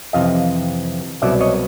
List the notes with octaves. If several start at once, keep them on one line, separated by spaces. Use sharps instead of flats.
F2 C3 E3 D#5 F5
C2 B2 F#3 D5 E5
C#5 D#5